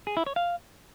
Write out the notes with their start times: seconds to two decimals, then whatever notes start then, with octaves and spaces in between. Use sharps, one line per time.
0.07 G#4
0.17 E4
0.26 C#5
0.36 F5